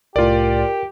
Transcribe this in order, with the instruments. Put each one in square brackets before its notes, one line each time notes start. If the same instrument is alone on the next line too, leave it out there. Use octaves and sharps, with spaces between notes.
[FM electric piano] C2 A2 [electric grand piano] F4 D5 [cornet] G4 [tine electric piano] A#4